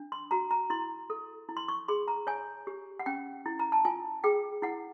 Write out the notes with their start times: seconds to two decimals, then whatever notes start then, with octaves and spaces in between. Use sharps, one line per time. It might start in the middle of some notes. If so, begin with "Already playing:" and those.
Already playing: D4
0.12 C6
0.31 F#4 A#5
0.51 A#5
0.70 E4 C6
1.10 A4
1.49 E4
1.57 C6
1.68 C#6
1.88 G#4 C6
2.08 A#5
2.27 C#5 G#5
2.67 G4
3.00 F#5
3.06 C#4 G5
3.46 E4
3.59 A#5
3.72 A5
3.85 F4 G#5
4.24 G#4 G5
4.62 E4 F#5